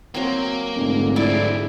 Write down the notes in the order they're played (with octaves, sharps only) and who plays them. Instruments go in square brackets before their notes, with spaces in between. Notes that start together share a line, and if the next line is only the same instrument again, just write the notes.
[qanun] F#3 C4 [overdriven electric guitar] A#3
[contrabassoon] F1 [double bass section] G#2 D3 G#3
[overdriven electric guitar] F#3 C4 [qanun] E4 D5